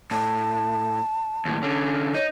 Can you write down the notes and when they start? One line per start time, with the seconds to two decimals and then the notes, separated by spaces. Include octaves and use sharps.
0.11 A2 A5
1.45 D#2 A2
1.63 D3 C#4
2.15 D#4 C#5